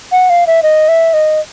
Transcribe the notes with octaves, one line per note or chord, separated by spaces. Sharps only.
F#5
F5
E5
D#5
E5
D#5